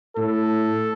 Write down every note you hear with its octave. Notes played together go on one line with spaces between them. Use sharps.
A2 A4